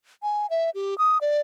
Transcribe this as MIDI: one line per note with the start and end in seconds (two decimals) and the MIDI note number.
0.23 0.46 80
0.50 0.70 76
0.74 0.97 67
0.98 1.18 87
1.21 1.41 74